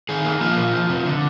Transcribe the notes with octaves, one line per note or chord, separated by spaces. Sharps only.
D#3 G#4
A#3
F3 F4
A#2
F3
C3
D3